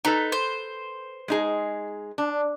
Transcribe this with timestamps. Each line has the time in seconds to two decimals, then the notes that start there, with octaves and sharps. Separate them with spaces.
0.05 D#4 A4 B4 A#5
0.32 C5
1.28 G#3 D#4 G#4
2.18 D4